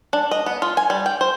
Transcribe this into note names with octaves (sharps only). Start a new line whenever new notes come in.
D4
D#5
B3
F4
G#5
G3
G5
C5